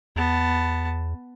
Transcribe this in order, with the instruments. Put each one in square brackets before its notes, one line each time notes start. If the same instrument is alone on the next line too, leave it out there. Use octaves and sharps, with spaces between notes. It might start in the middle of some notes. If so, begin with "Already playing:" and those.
[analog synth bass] E2 [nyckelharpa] B3 A5